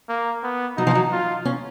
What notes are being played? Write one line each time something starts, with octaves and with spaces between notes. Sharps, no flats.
A#3
B3
F#3 D#4
F3
F#3
F4
C#4